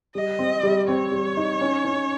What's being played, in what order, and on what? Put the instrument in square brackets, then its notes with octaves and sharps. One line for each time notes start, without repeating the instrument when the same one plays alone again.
[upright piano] G3 [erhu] D#5
[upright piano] C4
G3
[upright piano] C4 [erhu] C#5
[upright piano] G3
D#4
C#4
C#4